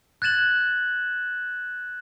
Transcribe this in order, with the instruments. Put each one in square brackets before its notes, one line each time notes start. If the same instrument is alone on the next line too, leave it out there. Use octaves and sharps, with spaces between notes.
[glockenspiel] F#6 G#6 A6 E7 F#7